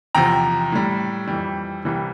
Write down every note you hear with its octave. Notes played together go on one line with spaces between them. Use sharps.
E2 C3 F3 G5 A#5
A2 G3
F2 E3 G3
C2 C3 E3 G3